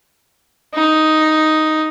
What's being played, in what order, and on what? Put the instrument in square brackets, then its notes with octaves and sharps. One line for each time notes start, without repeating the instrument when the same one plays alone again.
[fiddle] D#4